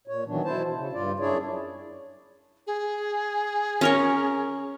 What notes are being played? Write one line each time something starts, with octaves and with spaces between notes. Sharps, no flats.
A#2 C#5
D#3 E3 F#3 B3 D4
B2 E4 C5 A5
C#3
G2 F4 D5
F#2 D4 E4 G#4 C#5 D5
G#4
C#4 A#4 C#5